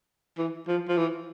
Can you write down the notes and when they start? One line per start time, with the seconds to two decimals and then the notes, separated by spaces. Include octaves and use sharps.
0.38 E3
0.68 F3
0.88 F3
0.97 E3